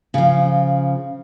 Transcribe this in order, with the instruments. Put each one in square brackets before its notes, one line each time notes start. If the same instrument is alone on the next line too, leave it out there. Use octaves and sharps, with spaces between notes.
[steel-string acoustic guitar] C#3 F3